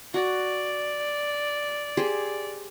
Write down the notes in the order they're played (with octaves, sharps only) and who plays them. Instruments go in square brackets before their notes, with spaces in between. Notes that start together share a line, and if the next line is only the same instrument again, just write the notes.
[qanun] F#4 [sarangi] D5
[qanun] G4 G#4 C5